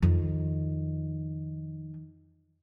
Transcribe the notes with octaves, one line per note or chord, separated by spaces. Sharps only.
F2 D#3